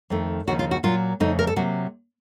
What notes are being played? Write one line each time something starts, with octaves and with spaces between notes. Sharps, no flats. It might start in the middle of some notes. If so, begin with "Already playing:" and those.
F2 D#3 A3
D#2 C#3 F3 F#4
F4
F#4
A#2 F#3 A#3 F4
F2 C#3 A3 D#4
A#4
A4
C3 F#3 A#3 F#4